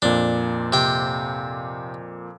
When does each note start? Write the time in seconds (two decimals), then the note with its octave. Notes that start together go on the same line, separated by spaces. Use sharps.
0.02 F2 A#2 D4
0.73 C3 G5